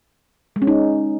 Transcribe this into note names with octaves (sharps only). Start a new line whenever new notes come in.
G#3
C#4
D#4